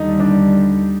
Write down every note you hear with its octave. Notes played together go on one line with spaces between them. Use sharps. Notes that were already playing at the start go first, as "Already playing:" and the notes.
Already playing: D#2 D3 G3 D#4
D4